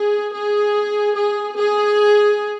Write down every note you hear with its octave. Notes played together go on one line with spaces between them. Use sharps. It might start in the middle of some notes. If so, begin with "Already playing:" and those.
Already playing: G#4
G#4
G#4
G#4